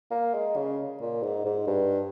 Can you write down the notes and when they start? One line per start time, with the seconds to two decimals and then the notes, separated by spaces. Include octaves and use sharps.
0.11 A#3
0.34 G#3
0.56 C#3
1.01 A#2
1.23 G#2
1.45 G#2
1.67 G2